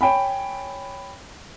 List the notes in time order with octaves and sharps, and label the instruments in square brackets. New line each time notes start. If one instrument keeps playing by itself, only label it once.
[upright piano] C#5 G5 G#5 B5